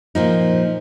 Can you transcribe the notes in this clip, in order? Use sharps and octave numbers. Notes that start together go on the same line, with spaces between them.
A#2 F3 D#4